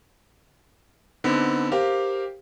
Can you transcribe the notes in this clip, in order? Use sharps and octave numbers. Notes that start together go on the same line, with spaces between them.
D3 B3 C4 D#4
G4 A#4 C5 F5